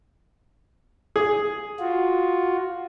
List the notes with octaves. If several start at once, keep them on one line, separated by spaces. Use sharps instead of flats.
G#4
F4 F#4